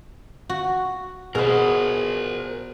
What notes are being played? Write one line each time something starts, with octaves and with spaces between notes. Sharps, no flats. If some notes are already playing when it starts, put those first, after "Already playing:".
F#4
B2 B3 G#4 A#4 C5